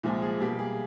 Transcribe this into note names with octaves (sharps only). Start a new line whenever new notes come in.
C2 A#2 F3 G#3
G#4
B2 G3 A#3 G4
G#4